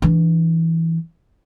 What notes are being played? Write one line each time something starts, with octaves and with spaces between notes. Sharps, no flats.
E3 D4